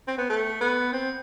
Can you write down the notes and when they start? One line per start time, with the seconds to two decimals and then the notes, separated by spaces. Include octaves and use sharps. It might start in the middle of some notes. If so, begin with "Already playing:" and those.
0.08 C4
0.18 B3
0.29 A3
0.60 B3
0.93 C4